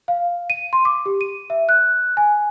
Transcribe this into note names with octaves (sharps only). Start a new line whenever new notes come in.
F5
D#7
C6
D6
G4
D#7
E5
F#6
G#5